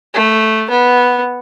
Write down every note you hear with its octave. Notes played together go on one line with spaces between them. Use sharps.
A3
B3